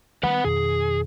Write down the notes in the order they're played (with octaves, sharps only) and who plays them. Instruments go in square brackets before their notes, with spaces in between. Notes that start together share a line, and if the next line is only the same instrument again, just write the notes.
[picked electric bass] D#3 G3 [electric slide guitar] B4 F#5
[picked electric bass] F2 B2 D#3 [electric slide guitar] G#4